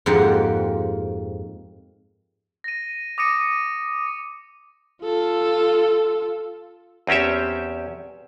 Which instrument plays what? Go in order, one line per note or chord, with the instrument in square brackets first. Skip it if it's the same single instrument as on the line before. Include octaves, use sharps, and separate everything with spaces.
[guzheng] F2 G#2 F3 A#3 G4 F#5
[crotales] A#6 D#7
D6 D#6 A#6 C#7 D#7
[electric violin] F4 A4
[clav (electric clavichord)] E2 C4 C#4 G4 E5